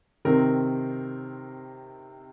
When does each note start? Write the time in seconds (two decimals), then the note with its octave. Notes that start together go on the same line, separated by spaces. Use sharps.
0.25 C3 D#3 C4 A#4